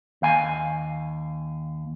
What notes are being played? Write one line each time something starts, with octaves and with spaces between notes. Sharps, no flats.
D#2 F5 G#5